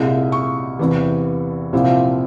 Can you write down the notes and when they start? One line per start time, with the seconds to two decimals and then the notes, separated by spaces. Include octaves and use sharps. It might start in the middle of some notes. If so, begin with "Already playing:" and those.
Already playing: C2 A#2 G#3 E4
0.32 C#6
0.79 E2 C3 E3
1.72 C2 A#2 F3 C4 E4